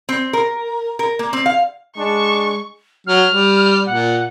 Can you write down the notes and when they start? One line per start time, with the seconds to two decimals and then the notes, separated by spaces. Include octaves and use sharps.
0.09 C4
0.33 A#4
0.99 A#4
1.19 A#3
1.33 C4
1.46 F5
1.98 G#3 D4 C#6
3.07 F#3 F6
3.31 G3
3.86 A#2 F#5